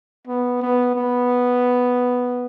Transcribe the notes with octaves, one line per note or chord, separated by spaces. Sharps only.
B3
B3
B3